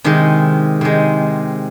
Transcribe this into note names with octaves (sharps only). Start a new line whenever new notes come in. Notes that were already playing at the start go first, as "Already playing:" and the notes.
C3 D#3 G#3
C3 D#3 G#3